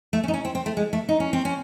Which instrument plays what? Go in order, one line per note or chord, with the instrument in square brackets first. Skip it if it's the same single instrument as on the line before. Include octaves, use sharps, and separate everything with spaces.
[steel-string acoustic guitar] A3
C#4
D#4
C#4
C4
C4
A3
G#3
A3
D#4
C#4
C4
C#4